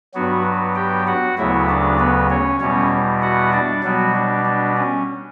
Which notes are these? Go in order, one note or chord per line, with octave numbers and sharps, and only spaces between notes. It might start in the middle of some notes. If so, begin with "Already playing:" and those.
G2 F#3 B3 F#4
G4 G5
F#4 F#5
D2 C#3 F#3 B3 E4 E5
D4 D5
B3 B4
C#4 C#5
E2 B2 G3 B3 C#4 C#5
F#4 F#5
D4 D5
B2 F#3 G3 B3 F#4
D4
D4
C#4